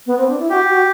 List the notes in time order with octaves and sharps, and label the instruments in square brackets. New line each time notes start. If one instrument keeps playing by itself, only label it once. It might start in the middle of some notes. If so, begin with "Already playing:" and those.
[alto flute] B3
C4
D4
E4
[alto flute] F#4 [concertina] G4
[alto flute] F#4